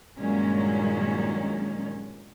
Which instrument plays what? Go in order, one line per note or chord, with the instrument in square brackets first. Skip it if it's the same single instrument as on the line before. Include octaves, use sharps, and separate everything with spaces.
[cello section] G2 A#2 D#3 F#3 G#3 C#4